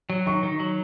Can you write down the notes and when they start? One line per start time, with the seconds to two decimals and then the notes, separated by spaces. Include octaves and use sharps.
0.10 F#3
0.26 D#3 C#6
0.43 D#3
0.60 F#3